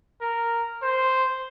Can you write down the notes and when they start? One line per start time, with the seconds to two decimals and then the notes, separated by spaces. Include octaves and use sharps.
0.21 A#4
0.82 C5